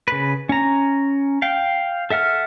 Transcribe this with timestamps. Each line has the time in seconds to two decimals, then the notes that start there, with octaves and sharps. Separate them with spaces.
0.08 C#3 B4
0.49 C#4 A#5
1.42 F5 G5
2.10 A4 E5 F#5 F6